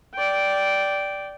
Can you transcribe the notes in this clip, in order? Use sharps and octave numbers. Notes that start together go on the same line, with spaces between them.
D5 G5